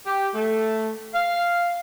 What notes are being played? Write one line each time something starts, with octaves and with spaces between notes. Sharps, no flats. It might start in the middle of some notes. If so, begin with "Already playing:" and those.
G4
A3
F5